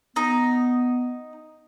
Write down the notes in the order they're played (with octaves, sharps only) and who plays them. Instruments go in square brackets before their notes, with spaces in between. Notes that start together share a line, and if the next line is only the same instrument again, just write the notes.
[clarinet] B3 [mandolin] D#4